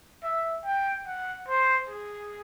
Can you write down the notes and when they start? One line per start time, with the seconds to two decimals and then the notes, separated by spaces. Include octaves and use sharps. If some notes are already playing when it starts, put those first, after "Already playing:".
0.23 E5
0.65 G5
1.07 F#5
1.48 C5
1.89 G#4